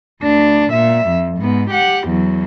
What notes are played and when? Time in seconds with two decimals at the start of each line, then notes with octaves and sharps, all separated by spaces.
0.23 D2 D4
0.72 A#2 E5
1.08 F2
1.39 G#2 B3
1.71 G4 F#5
2.07 E2 F#3